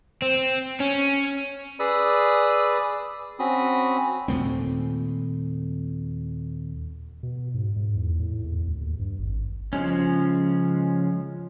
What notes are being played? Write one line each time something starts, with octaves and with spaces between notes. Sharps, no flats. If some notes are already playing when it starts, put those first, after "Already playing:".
C4
C#4
G#4 B4 D5 B5 D#6 E6
C4 C#4 F#4 B5 D#6
D#2 A#2 A3 C4
B2
G#2
G#2
E2
A2
E2
D2
D#2
G2
G#1
C#3 F3 G#3 C#4